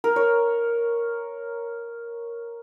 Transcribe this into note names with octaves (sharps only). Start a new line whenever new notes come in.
A#4
C#5